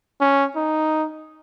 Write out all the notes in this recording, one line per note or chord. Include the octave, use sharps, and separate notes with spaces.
C#4
D#4